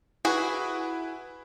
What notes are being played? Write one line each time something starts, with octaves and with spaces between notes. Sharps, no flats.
E4 F#4 G#4 B4